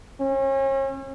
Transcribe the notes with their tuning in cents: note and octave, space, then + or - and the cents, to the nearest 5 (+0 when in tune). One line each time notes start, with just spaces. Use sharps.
C#4 -40